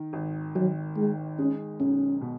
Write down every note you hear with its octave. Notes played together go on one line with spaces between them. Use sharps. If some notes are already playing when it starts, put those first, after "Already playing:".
Already playing: D#3
G#1
G#1 F#3
D#3 G#3
G#3 C#4
B1 C#4
B2